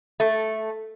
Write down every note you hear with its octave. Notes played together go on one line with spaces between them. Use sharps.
A3